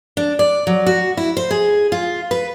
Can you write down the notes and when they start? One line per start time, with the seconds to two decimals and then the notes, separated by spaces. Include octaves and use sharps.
0.17 D4
0.39 D5
0.67 F#3
0.86 F#4
1.17 E4
1.37 C5
1.51 G#4
1.92 F4
2.31 B4